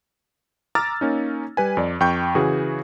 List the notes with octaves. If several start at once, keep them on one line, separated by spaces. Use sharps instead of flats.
A#5 D6 E6 F6 A6
A#3 C#4 D#4
G3 B4 G#5
F2 D5
F2 G5 C#6 G6
C#3 E3 F#4 G#4